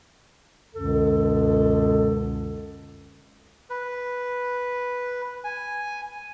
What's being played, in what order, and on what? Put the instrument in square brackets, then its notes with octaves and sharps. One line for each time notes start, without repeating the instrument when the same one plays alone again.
[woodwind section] C#2 F#2 B2 D3 A4
[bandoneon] B4
G#5